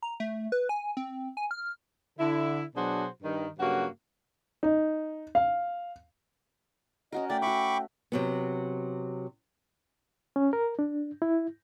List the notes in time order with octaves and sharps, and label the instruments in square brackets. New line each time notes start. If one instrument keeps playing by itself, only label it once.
[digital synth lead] A#5
A3
B4
G#5
C4
G#5
F6
[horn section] D3 E4
B2 F#3 D4 F#4 G#4 C5
G2 D#3
G2 C#3 F#3 A#3 F#4
[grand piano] D#4
F5
[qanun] C#4 F#4 A#4 [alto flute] D#5
[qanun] A3 [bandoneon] D5 [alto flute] G5
[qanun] F#4 E5 [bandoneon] B5 C#6 D6
[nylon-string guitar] C3 F#3 B3
[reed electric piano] C#4
A#4
D4
E4